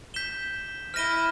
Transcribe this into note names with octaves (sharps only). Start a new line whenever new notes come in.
G6 B6 E7 G7
E4 F6 A#6 D#7 G7